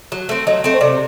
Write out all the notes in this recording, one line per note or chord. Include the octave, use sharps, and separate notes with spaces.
F#3
A3 C4
F#3 D#5
A3 C4
C5
C3 D5